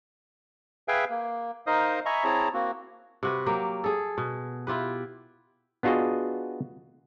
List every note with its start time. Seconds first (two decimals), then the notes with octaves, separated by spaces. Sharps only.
0.88 G#4 B4 E5 F5 G5 G#5
1.10 A#3
1.67 D#4 A#4 C5 D#5 F5 D#6
2.06 D#5 E5 G#5 A#5 B5 C#6
2.24 C4 E4 G#4 C#5 A5 A#5
2.54 A#3 C4 F#4
3.23 C3 F#4 B4
3.46 F#3 A#3 G4
3.84 G#4 A4
4.18 B2
4.67 E4 F4 G4 B4
5.83 B3 D4 F4 F#4 G#4 D#5